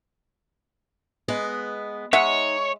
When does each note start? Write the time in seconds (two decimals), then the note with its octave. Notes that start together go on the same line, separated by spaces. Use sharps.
1.28 G#3 B3 D#5
2.13 G#3 D#4 C#5 E5 F#5